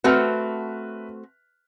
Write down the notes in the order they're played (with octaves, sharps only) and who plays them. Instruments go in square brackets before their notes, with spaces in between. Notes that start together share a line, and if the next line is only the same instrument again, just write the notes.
[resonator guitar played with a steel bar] A3 C4 F#4 [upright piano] B4 E5 F6